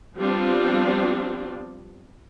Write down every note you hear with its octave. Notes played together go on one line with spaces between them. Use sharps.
F3 G3 B3 C4 D4 F4